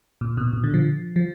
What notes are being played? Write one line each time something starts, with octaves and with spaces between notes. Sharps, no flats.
A#2
B2
B2
D3
F3
F3